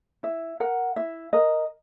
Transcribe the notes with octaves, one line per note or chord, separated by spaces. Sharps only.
E4 E5
A#4 F#5
E4 E5
A#4 D#5